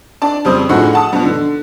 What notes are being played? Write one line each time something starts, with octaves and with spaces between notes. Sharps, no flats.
D4 D5 A5
F2 C#3 G3 C4 D#6
A2 D3 F3 D#4 F#4 G#4
F#5 A5 D#6
G2 B2 F3
D3